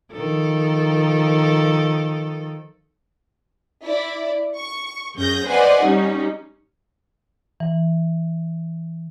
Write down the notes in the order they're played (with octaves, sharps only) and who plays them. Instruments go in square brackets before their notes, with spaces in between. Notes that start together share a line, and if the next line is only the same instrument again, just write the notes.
[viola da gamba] D#3 F3 A4
[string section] E4 D5
C#6
F#2 C#4 G#4 G6 A#6
B4 C5 D5 D#5 F#5 G#5
G3 C#4 D#4
[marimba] E3